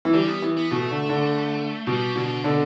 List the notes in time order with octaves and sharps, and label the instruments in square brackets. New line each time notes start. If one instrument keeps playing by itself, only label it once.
[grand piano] E3
[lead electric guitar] D3 [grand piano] G3
[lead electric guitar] B3
[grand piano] E3
[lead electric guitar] B3
[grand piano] B2 [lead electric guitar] A3
[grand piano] D3
D3
[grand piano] B2 [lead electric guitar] G3
[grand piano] B2 [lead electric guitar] D3
[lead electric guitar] B2 [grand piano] D3